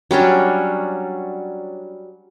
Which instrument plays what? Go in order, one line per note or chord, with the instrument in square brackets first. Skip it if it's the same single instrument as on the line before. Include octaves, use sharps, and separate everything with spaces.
[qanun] F#3 G3 C#4 D4